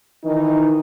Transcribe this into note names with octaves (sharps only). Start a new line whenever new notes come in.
D#3 E3 D#4